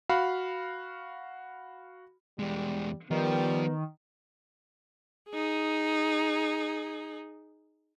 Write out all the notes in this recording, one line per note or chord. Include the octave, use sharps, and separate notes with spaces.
F#4 F5 B5
E2 G3 G#3
D#3 F3 G3 B3
D#4 G#4